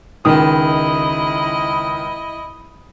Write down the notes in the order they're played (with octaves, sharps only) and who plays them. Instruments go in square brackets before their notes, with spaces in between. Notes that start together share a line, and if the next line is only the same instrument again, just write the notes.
[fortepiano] C#2 D#3 D#6 [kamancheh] E4 D#5